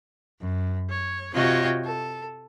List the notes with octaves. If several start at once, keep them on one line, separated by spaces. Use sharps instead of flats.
F#2
C#5
C3 F4 F#4 C#5 D#5 G5
A4